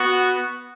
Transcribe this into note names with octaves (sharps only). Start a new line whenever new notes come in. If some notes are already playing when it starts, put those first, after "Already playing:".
Already playing: B3 F#4